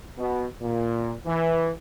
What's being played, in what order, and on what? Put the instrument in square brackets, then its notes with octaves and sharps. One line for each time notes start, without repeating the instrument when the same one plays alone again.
[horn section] B2
A#2
E3